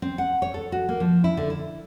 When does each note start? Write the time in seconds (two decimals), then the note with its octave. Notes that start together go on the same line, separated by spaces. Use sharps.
0.02 C4
0.18 F#5
0.42 C#5
0.54 A4
0.72 F#4
0.89 A#3
1.00 F3
1.24 E4
1.37 D3
1.50 E4